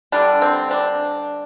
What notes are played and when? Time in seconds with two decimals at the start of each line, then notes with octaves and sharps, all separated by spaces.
0.12 D3 G3 D4
0.42 C4
0.71 D4